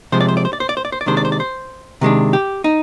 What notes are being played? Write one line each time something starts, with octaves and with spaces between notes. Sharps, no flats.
C3 F3 G#3 C5
D5
C5
D5
C5
D5
C5
D5
C5
D5
C5
D5
C3 D#3 G#3 D4 C5
D5
C5
D5
C5
C3 D#3 G#3 D4
G4
D#4